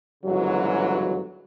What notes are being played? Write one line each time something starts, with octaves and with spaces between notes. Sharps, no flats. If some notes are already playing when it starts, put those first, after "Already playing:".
G1 G#2 C#3 E3 F#3